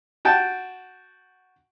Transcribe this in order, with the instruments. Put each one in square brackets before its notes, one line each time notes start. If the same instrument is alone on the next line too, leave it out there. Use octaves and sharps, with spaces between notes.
[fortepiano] F#4 G5 A5